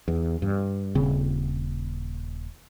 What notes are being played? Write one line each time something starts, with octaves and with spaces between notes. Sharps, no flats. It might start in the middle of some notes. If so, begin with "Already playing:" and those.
E2
G2
D#1 C#3 C4